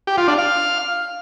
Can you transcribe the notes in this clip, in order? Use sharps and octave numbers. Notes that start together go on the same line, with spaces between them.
G4
F4
D4
F5